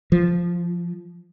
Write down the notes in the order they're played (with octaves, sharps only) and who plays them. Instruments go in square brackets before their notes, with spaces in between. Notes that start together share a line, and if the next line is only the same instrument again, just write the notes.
[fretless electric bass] F3